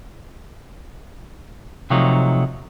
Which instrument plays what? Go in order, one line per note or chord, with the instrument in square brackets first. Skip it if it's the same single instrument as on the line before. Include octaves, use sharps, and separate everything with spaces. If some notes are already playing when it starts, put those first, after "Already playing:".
[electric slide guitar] C3 F3 F#3 A3 D#4